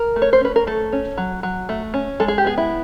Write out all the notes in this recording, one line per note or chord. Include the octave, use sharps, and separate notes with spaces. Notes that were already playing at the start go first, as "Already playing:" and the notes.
Already playing: A#4
A3
C#5
C5
C#4 B4
A#4
A3 A4
C#4
F#3
F#3
A3
C#4
G#3 A4
G#4
G4
B3 G#4
E4